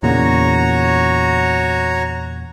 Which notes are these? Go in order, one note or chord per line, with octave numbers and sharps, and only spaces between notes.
E2 A#2 C#3 F#4 C#5 A#5